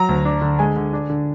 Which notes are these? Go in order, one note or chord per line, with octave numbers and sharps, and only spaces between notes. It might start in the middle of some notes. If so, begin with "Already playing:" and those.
Already playing: F#3 A#5
D2
D4
D3
G#3 G#5
D3
D4
D3